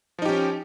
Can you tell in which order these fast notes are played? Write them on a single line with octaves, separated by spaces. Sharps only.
F3 D#4 G4 C#4